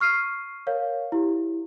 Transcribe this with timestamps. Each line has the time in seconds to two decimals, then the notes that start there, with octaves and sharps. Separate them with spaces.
0.01 C#6 F6 C7 D#7
0.67 A#4 C#5 F5
1.12 E4 G4